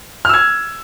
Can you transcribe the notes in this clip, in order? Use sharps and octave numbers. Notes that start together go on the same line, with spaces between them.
E6 F6 G#6